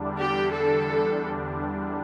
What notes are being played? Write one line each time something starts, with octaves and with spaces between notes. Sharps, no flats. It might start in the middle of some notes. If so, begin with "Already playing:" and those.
Already playing: E2 D3 G3 D4
G4
A4